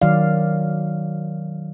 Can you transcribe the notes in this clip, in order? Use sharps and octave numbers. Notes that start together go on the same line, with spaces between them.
D#3 F#3 D5 F5